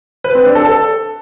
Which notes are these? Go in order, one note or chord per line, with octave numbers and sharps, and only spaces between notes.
B4
C4
D4
A4
A4